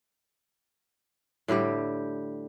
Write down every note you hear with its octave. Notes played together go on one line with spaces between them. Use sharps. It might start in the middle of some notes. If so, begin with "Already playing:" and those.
A2 D3 G3 G4